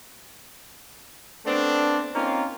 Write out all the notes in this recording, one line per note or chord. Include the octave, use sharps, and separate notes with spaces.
A3 B3 C4 D4
A#3 C4 C#4 D#4 F4